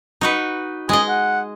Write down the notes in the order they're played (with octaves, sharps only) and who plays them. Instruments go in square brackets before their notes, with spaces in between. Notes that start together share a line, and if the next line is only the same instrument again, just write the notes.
[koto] D#4 F#4 B4
[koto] G#3 D#5 [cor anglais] G#4
[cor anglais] F#5